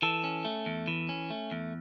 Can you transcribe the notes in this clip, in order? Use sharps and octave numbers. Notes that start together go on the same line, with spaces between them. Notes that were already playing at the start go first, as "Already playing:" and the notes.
E3 A4
C#4
A3
E2
E3
C#4
A3
E2